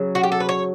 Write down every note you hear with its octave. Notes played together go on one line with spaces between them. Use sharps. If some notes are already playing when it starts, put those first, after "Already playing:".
Already playing: C#3 F#3
F#4
G4
A4
B4
C#5